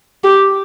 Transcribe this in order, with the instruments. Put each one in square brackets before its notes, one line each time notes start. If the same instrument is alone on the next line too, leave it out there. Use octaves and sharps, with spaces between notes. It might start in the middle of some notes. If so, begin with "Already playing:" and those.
[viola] G4